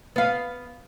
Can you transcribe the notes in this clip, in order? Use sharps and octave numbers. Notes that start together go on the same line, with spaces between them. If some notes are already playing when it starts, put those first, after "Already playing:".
B3 F5